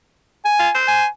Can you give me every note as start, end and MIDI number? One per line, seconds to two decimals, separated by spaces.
0.45 0.73 80
0.60 0.70 65
0.75 1.05 72
0.88 1.08 80